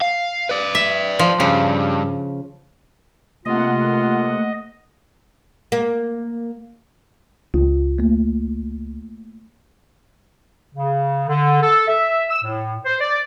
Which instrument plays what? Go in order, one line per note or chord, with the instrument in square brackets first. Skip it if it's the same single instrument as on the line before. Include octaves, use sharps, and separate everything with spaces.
[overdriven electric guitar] F5
B4 D5
[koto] E5
F3
[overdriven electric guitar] G2 [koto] C#3
[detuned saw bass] C3 [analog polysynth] A3 A#3 F#5 [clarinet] F4 [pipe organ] D#5
[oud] A#3
[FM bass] C#2 [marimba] F4
[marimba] A3 A#3
[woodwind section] C#3
D3
A4
E5
E6
A2
C5
D5